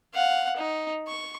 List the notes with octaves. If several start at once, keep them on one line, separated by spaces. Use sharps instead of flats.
F5 F#5
D#4
C#6